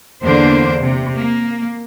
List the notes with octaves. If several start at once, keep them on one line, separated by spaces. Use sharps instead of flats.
E2 D3 A#3 D4 C5
C3
A#3